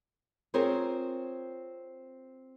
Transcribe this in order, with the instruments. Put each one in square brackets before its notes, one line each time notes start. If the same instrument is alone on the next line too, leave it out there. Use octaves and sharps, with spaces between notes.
[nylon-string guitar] C4 F4 G#4 A#4 C5 C#5